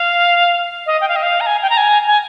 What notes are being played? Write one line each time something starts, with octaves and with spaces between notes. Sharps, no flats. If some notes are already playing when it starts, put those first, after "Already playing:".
Already playing: F5
D#5
G5
F5
D#5
F5
A#5
G#5
G5
A#5
G#5
G#5